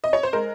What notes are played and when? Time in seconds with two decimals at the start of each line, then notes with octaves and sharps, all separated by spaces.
0.04 D#5
0.13 C#5
0.23 C5
0.33 G#3 A#4